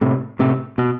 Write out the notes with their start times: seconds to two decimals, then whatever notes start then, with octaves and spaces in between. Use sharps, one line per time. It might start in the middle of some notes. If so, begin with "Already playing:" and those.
0.01 A2 C3
0.39 A2 C3
0.78 B2